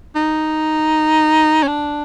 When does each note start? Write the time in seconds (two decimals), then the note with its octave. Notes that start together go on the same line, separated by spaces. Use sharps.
0.16 D#4
1.63 C#4
1.67 D4